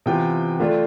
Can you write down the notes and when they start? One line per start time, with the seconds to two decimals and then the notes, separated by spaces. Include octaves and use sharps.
0.06 C3 E3 B3 F4 G5
0.59 D3 A3 D4 F4